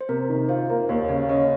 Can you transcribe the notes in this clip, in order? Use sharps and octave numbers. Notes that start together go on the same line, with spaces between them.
C5
C3 A#4
D#3
F4 C5
A#3
D#2 C#5
C#3 C#5
C#4 D#5